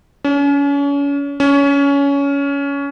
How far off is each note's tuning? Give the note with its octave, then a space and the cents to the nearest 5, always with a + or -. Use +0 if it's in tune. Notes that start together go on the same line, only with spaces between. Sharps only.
C#4 +35
C#4 +20